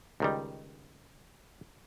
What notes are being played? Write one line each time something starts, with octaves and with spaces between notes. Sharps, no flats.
C#2 D#3 G3